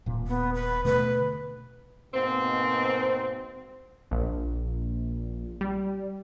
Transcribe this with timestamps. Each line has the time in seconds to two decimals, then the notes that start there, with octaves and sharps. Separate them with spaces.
0.06 D#1 A#2
0.27 B3
0.54 B4
0.85 B2 D3 A3 B4
2.14 G#2 B2 A#3 C4
4.11 A#1
5.61 G3